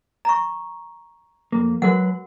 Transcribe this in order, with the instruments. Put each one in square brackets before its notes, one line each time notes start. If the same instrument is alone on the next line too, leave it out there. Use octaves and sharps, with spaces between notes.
[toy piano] A#5 C#6
[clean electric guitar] F2 A#3
[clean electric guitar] F#3 G#3 B4 [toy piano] F#4 A#4 F#5